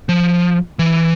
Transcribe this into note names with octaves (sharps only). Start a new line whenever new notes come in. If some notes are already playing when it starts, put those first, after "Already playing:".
F3
E3